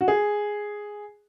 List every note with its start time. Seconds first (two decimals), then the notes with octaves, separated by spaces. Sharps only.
0.01 F#4
0.08 G#4